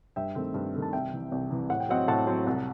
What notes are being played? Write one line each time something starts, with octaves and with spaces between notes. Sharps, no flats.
G2 E5 G5
D#3 A3 C4
G2
D#3 A3 C4
A5
C2 E5 G5
C3 E3
C2
C3 E3
A2 F#5
G5
F#3 C4 D#5 F#5
A2 F#5 A5
F#3 C4
C2